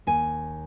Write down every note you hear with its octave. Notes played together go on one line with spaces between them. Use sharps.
D#2 G#5